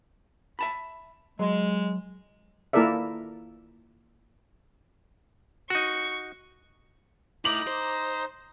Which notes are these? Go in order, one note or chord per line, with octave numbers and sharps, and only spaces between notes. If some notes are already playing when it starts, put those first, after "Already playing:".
E5 A5 B5
F#3 G#3
A#3 E4 A4 A#4 D5 E5
D#4 F#4 C#6
A3 D#4 E4 A#5 D6 F7 F#7
C5